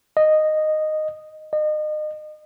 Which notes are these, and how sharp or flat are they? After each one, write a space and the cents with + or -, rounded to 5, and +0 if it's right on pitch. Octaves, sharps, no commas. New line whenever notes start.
D#5 -10
D#5 -35